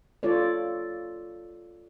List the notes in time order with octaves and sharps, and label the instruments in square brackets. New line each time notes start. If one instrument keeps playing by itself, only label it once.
[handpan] F4 A4 C#5 D5